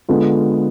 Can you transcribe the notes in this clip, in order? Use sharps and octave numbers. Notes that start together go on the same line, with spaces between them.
D3 G#3 B3 F4